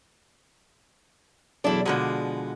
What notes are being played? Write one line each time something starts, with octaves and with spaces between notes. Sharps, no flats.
B1 E2 D4 E4
B2 D3 F3 G#3